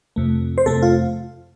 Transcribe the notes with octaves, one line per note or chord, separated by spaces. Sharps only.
F2 C3 A3
C5
F2 C3 A3 A4
F4